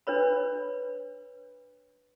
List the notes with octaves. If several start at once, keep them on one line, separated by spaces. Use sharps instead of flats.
D4 B4 C#5 B5